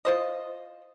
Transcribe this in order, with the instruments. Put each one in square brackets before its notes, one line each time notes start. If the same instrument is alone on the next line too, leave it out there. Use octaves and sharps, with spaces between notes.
[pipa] F4 C5 D#5